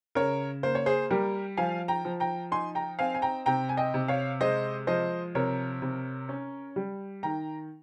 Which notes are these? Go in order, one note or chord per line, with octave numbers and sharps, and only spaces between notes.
C#3 A#4 C#5
A#3 C5
C#5
G#4 C5
G3 G4 A#4
F3 F5 G#5
G5 A#5
F3
G5 A#5
D#4 G#5 C6
G5 A#5
C4 F5 G#5
G#5
G5 A#5
C3 G5 A#5
G#5
D#5 G5
C3
C#5 F5
G#3 C5 D#5
F3 C5 D#5
C3 A#4 C#5
C3
C#4
G3
D#3 G5 A#5